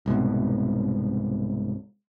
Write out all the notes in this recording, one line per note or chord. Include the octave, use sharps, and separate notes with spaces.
C2 G#2 B2